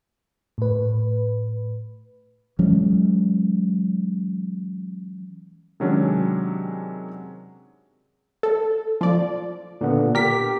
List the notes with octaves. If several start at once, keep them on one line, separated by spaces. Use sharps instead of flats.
A2 B4
E3 F#3 G#3 C#4
C3 D#3 F#3 G#3 C#4 D4
A4
F3 D5
A#2 D3 B3
G4 A#4 B6